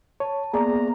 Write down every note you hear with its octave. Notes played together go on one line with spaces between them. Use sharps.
C#5 A5
A#3 B3 G#4 C5 D5 A#5